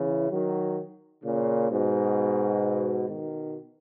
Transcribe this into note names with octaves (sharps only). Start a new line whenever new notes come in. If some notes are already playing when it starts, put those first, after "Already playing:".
Already playing: C#3 E3
D#3 F#3
A#2 C#3
G#2 B2
B2 D#3